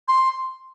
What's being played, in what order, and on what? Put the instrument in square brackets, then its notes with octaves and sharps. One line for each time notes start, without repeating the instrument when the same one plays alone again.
[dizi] C6